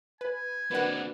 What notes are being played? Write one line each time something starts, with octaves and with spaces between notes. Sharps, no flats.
B4 G#5
A#3 C4 D4 F#4 B4 F#5